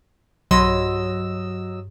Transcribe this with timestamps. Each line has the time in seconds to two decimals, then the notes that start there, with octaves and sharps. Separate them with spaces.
0.51 B1 G2 F#3 D#5 C6 E6